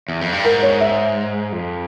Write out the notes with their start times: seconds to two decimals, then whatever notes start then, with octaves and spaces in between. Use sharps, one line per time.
0.08 E2
0.21 F2
0.33 G2
0.45 G#2 A#4
0.63 C#5
0.81 E5
1.52 F2